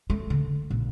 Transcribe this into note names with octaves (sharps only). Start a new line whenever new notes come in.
A3
D3
A#1